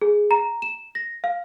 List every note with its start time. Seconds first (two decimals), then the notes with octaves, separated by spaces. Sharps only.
0.02 G#4
0.31 A#5
0.62 E7
0.95 A#6
1.24 F5